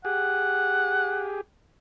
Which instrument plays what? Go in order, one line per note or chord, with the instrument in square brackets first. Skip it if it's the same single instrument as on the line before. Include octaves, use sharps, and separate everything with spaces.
[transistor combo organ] G4 G#4 [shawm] F#5